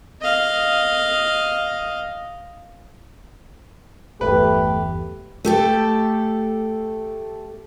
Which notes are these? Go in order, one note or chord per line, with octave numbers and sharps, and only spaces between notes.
D#5 F5
G1 E2 A3 G4 B4
A3 G4 A4